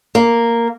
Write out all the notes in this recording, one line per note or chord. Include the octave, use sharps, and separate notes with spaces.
A#3